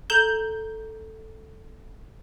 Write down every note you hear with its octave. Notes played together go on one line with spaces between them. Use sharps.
A4 A#5 G6 E7